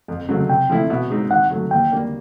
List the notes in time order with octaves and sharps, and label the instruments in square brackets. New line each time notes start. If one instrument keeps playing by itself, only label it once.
[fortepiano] F2
C#3 F#3 A3 C4
[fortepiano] C3 [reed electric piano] G5
[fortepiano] F3 A3 C4 E4
B2
G#3 C4 D#4
[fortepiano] D#3 [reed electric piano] F#5
[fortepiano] F#3 A3
[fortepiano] D#2 [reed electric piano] G5
[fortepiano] D3 G3 A#3